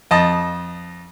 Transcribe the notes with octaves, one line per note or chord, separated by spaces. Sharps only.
F2 D#5 A5